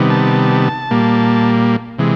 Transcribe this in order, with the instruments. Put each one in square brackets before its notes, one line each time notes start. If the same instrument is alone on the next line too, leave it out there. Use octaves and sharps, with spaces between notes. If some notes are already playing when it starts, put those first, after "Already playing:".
Already playing: [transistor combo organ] C3 D#3 G3 B3
A5
A#2 G3 A#3
C3 E3 G#3